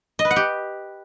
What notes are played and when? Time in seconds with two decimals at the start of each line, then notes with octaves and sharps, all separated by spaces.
0.19 D#5
0.25 B4
0.31 F#5
0.36 G4